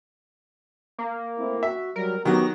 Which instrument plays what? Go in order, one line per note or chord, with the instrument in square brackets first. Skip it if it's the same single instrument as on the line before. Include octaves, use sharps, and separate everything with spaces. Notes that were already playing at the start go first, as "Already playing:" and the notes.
[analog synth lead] A#3
[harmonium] A3 C4 E4
[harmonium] F#4 [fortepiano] E5
[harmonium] F#3 G3 [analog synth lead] A#4
[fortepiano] D#3 F#3 [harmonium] B3 F#4 G4 [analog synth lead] A#6